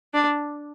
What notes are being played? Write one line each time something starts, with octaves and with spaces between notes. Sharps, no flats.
D4